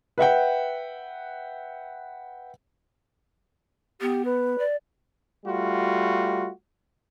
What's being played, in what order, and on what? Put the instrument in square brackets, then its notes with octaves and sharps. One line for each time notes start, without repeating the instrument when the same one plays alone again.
[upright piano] B4 E5 F#5 G5
[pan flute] B3 [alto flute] G4
[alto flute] B4
[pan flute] D5
[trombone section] G3 A3 F4 F#4